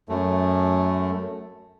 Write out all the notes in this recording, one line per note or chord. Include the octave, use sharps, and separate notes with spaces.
F#2 A3